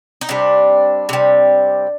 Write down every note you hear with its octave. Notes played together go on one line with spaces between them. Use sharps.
D#4
C3 G3 D4
C3 G3